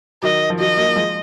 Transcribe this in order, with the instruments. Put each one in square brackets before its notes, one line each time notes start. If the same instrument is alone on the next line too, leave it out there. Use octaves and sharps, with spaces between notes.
[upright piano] D#3 F#3 [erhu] D#5
[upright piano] F3
[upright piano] D#3 F#3 [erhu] D#5
[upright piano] F#3 A#3
F3 G#3